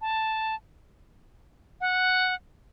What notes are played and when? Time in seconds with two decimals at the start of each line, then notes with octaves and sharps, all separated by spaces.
0.01 A5
1.81 F#5